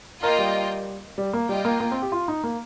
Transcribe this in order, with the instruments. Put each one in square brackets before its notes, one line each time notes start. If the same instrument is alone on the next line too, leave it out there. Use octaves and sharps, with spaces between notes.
[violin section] A#3 F4 D#5 G5 [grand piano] A#4
[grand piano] G3
G3
A#3
[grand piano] G3 [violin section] F4 D#5 G5
[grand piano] A#3
A#3
C4
G4
F4
D#4
A#3